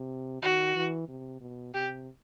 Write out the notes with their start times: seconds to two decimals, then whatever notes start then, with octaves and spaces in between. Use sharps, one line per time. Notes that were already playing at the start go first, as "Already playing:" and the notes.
Already playing: C3
0.42 D#3 F#4
0.75 E3
1.08 C3
1.41 B2
1.74 C3 G4